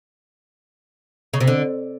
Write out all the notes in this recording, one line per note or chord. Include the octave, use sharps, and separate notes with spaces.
C#3
C3
D3